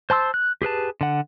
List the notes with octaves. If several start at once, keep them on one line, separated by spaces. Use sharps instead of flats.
C5 A5 C6 E6
F#6
G4 G#4 B4 A5
D3 F#5